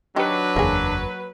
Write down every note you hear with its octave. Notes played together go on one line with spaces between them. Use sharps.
D#3 F#3 D4 G4 B4
F#1 E2 A#3 G#4